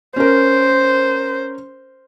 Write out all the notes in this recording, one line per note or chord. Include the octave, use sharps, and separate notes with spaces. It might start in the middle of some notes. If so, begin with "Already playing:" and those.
C#4 A#4 C5